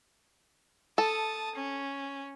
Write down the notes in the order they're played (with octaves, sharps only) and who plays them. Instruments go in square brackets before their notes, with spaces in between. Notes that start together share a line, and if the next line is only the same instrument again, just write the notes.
[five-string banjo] A4 [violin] A5 D#6
[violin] C#4